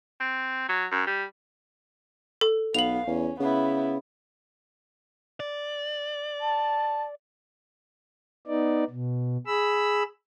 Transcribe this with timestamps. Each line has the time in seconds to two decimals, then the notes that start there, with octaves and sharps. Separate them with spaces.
0.20 C4
0.68 F#3
0.91 F#2
1.07 G3
2.41 A4
2.74 B1 B3 F5 F7 F#7
3.07 E2 C#4
3.40 C#3 B3 E4
5.40 D5
6.41 A5
8.47 B3 D#4 D5
8.90 B2
9.47 G#4 B5 E6